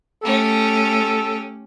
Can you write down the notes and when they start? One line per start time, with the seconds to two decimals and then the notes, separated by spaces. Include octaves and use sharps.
0.23 A3 C#4 G4 A4